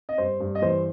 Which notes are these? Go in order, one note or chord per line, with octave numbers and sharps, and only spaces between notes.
D#5
G2 C5
G2
D#5
E3 C5